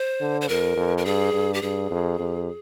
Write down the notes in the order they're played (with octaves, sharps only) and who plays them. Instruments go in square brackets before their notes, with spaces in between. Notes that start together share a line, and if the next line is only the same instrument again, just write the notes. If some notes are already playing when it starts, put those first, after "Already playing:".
Already playing: [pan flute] C5
[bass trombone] D3
[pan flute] C5
[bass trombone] F2 [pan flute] A#4
[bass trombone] F2
[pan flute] A#4
[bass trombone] G2 [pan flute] G#4
[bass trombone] G2
[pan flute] G4
[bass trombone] G2 [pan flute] G#4
[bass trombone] F2
F2